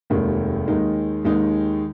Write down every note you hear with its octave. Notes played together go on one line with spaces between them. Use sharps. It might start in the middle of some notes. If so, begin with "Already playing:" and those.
F1 D#2 D#3 G#3
D#2 D#3 G#3 D#4
D#2 D#3 G#3 D#4